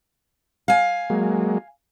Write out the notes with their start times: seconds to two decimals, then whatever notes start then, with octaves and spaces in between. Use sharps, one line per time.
0.68 F5 G#5
1.10 F#3 G#3 A#3